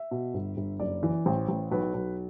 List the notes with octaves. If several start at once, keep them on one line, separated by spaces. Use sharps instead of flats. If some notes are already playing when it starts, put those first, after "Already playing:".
Already playing: E5
B2
G1
G1
F#1 D5
E3
A1 C5
A1
B1 B4
B1